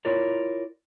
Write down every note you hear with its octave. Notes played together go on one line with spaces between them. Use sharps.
E4 F4 A#4 C#5 D5